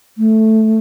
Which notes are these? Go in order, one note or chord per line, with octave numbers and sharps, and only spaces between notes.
A3